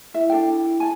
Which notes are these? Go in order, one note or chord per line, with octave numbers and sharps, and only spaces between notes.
E4 E5
D4 A4 G5
G#5 A5